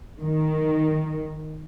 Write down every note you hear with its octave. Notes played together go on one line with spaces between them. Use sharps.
D#3